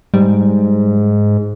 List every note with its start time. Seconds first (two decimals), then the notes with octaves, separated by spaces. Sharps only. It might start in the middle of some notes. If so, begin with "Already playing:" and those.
0.14 G#2 G3